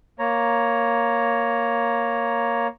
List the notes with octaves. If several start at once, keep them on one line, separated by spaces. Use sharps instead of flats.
A#3 C#5 A#5